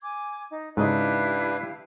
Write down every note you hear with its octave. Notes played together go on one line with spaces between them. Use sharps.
G#5 D6 G#6
D#4
G#2 C#3 D4 E4 G4 B4 D#5 F5